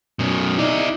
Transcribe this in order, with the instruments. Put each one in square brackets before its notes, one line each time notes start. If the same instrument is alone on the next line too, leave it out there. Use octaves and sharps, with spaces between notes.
[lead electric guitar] F#2 B2
[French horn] D#4 [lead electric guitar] E4 D5